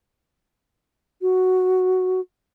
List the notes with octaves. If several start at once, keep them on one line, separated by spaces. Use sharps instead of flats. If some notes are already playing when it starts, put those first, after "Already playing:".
F#4